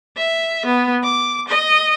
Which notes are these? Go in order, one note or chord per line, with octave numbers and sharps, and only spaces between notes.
E5
B3
D6
D#5